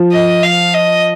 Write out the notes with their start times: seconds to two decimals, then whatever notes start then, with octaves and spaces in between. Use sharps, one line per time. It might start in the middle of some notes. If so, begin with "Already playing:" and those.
Already playing: F3
0.12 D#5
0.43 F5
0.74 D#5